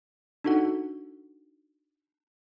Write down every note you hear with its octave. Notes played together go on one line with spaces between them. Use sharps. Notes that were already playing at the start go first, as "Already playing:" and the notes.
D4 D#4 F#4 A4 F#5